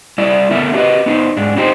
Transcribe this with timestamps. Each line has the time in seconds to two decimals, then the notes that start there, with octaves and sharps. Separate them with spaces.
0.18 G3 E4 D5
0.51 D3 A3 B3 E4 A#4 E5
0.74 D4 F#4 G4 A#4 B4 D#5
1.06 B3 D#4 C5
1.37 G#2 D4
1.56 C4 D#4 G4 G#4 C5